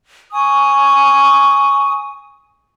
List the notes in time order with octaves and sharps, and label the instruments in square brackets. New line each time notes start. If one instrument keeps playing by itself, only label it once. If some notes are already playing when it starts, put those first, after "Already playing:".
[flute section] G#5 C#6 D#6